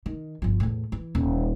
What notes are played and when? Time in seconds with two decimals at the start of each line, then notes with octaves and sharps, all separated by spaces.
0.06 D#3
0.42 G1 F3
0.60 E2 A2
0.92 E3
1.15 D#1